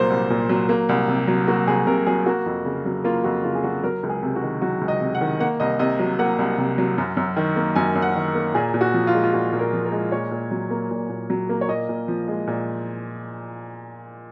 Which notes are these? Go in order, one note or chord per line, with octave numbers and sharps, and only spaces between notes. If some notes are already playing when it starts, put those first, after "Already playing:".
Already playing: C2 A#2 F#3 A#3 C5
C2
A#2
F#3
A#3
C2
C3
F#3
A#3 F#4
C2 G#4
C3 A#4
F#3 G#4
A#3 F#4
F2
C#3
F#3
A#3 F4
F2 F#4
C#3 F4
G#4
F#3 F#4
F#3 A#4
C#2
G#4
C3
F#4
D#3
F#3 F#4
C#2
D#5
C3
F#5
D#3
A#3 F#5
C2 D#5
C3 D#5
F#3
A#3 F#5
C2
C3
F#3
F#2
F#2
D#3
A#3
F#2 G#5
F#2
F#5
D#3
A#3
A#2 G#4
A#2
F#4
F3
F4
G#3
F4
A#2 F#4
A#2
A#4
F3
A#4
G#3
A#2 C#5
A#2
F#3
A#3
A#2
A#2
F#3
A#3
C#5
A#2 D#5
A#2
F3
G#3
A#2